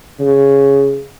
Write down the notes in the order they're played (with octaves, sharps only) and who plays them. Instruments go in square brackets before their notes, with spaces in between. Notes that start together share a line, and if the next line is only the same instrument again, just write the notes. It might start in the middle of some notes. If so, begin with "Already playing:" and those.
[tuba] C#3